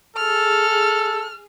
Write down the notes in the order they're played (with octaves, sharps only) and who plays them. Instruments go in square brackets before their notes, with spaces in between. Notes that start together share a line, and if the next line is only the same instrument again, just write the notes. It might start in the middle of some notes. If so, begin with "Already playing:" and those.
[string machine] G#4 [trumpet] A4 [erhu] F6